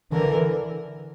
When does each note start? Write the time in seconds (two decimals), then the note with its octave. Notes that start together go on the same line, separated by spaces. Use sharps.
0.11 D3 E3 A#4